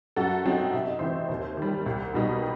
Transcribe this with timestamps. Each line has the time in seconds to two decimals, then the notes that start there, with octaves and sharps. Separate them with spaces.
0.16 F#2 F#4 A4
0.46 F#3 C4 D#4
0.74 C3 E5
0.86 D#5
0.99 E3 A3 C4 C5 E5
1.29 D#2
1.57 D#3 G3
1.86 C2
2.14 B2 G3 D#4